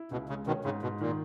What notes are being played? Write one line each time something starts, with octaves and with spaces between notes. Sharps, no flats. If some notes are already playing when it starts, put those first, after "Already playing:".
Already playing: E4
C#2 B2
C#3 G#3
B2 D#3 C#4
G#2 C#3
G#2 B2
A#2 D#3